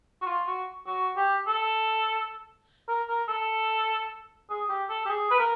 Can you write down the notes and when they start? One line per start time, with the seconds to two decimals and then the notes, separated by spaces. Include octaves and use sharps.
0.22 F#4
0.26 F4
0.47 F#4
0.87 F#4
1.17 G4
1.47 A4
2.88 A#4
3.09 A#4
3.29 A4
4.50 G#4
4.69 G4
4.90 A4
5.05 G4
5.09 G#4
5.31 B4
5.39 A#4